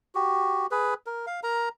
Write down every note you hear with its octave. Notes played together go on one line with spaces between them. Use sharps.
F#4 G4
G#4 B4
A#4
F5
A#4 A#5